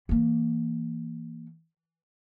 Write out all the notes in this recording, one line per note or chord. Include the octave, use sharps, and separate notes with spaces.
E3 A#3